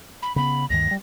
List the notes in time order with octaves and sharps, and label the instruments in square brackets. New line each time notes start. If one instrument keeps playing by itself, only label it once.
[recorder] B5
[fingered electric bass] C#3 B3 [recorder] B5
[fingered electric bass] D2 G2 D#3 [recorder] A#6
[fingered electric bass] F#3 G3